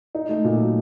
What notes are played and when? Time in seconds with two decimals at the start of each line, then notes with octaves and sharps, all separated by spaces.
0.15 D#4
0.29 A3
0.44 A#2
0.59 F#3